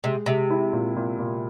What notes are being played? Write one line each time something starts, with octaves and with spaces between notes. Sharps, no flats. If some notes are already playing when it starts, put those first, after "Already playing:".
C3 G#3
C3 G#3
E4
A#2
A#2
A#2